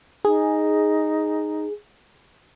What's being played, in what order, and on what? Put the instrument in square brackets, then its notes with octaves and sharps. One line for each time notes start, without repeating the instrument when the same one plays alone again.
[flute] D#4 [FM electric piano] G#4